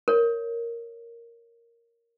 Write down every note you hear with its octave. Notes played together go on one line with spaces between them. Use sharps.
A#4 C#5